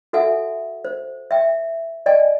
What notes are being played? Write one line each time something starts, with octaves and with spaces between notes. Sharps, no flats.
F#4 A4 E5 F#5 G#5
C5
E5 G5
D5 D#5 G5 G#5